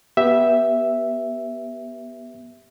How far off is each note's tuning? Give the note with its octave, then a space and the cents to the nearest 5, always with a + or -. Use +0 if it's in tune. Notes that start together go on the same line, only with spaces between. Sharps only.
B3 -15 G4 +0 E5 +0